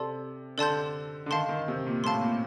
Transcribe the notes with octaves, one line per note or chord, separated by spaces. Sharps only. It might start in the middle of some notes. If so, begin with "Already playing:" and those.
Already playing: C3 A4 D5 A5 C6
D3 A4 D5 A5 C6 G6
D3
D#3 F5 A5 C6
D#3
C3
A#2
A2 F5 A5 C6
A#2